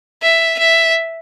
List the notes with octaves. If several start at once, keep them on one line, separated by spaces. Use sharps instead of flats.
E5
E5